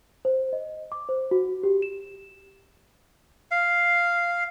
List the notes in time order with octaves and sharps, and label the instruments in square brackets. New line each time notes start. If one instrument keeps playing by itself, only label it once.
[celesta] C5
D#5
D6
C5
F#4
G4
E7
[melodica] F5